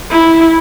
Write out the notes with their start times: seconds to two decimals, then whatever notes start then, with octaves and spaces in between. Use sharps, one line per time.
0.11 E4